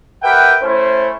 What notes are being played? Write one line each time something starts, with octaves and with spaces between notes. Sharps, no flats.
G4 A#4 B4 E5 F#5 G5
A3 C#4 E4 C5